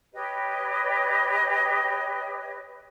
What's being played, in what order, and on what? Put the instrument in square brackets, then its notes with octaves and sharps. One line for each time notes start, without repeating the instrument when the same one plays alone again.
[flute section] G4 B4 C#5 D#5